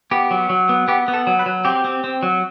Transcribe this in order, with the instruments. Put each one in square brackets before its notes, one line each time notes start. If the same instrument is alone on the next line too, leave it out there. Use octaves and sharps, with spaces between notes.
[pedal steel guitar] B3 G4
F#3
F#3
B3
B3 G4
B3
A4
F#3
B4
F#3
C4 G4
C4
C4
F#3